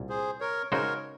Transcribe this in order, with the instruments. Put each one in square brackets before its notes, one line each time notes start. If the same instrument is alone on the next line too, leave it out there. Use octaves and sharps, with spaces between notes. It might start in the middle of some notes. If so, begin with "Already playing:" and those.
Already playing: [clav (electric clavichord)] C2 A#2
[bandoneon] G#4 C5
A#4 C#5
[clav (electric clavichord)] C#3 G#3 D#4 F#4 C5 [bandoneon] A#4 C#5